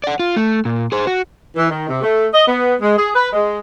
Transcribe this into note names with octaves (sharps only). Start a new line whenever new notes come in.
D5 F#5
F4
A3
A#2
G#4 C5
F#4
E3
D#3
C3
A3
D#5
B3
G#3
G#4
B4
G#3